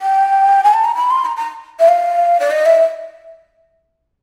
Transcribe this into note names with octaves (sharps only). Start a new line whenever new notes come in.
G5
G#5
A5
A#5
B5
C6
A#5
A#5
E5
F5
D5
D#5
E5